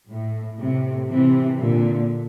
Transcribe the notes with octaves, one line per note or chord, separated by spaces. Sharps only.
A2
A2 C3
C3 E3
A#2 D3